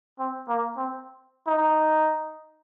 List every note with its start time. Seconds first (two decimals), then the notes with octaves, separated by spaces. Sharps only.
0.19 C4
0.49 A#3
0.77 C4
1.47 D#4